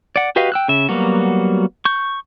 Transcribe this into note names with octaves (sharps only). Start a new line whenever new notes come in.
D5 F#5
F#4 G4 B4 D#5 F5
G5 E6 F#6
C#3 E5
F#3 G3 A#3 B3 F#4
C#6 G6